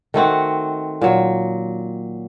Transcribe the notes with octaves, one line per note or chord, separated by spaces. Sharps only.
D#3 A3 C4 F#4
A#2 F#3